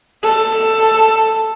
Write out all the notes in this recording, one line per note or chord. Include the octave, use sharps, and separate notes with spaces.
A4